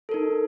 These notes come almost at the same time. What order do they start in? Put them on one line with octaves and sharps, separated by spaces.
A4 A#4 D#4